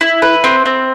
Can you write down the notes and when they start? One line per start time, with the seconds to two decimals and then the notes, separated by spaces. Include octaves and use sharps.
0.01 E4
0.22 B4
0.44 C4
0.66 C4